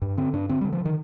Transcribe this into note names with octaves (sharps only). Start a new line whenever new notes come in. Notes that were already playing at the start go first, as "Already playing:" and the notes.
G2
D3 C4
G2 D4
D3 C4
G3
D3
F3
D3 D#3